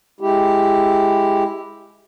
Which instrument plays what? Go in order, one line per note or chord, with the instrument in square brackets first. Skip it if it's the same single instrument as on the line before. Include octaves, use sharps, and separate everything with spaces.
[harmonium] G#3 E4 G4